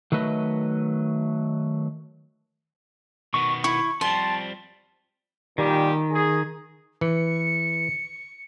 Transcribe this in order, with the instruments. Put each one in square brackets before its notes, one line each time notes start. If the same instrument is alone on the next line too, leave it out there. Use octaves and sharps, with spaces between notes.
[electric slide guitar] D#3 F#3 A3 B4 D#5
[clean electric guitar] B2 D#3 B3 [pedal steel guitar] C#6
[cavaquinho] E4 [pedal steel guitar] C#6
[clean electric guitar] F3 G3 C4 [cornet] A5 [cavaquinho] C6
[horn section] A#2 G3 G4 [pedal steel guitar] D#3
[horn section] G#4
[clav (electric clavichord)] E3 [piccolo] C#7